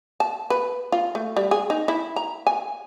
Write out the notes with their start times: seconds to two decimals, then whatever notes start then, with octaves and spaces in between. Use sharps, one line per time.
0.20 A5
0.50 B4
0.92 F4
1.15 A3
1.37 G3
1.51 G#4
1.70 D#4
1.88 E4
2.16 A#5
2.47 G#5